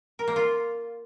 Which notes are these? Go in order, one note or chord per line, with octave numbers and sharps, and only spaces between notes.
A#4
A#3
F4